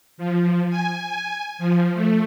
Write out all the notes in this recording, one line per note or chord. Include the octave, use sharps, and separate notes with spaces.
F3
G#5
F3
A3